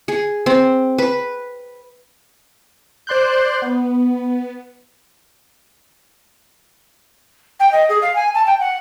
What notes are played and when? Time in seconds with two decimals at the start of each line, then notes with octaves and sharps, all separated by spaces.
0.08 G#4
0.46 C4
0.98 B4
3.07 C5 D5 C6 F#6 G6
3.62 B3
7.60 G5
7.72 D#5
7.89 G#4
8.02 F5
8.15 G#5
8.34 A5
8.46 G5
8.59 F#5